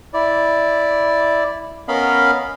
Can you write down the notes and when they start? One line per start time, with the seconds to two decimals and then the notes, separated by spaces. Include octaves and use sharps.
0.14 E4 D5
1.88 B3 C#4 A#4 D#5 F5 B5